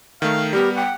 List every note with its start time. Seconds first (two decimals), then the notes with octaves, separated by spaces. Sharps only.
0.22 D#3 A3 F5
0.53 G3 B3 G4 A#4
0.76 F#5 G5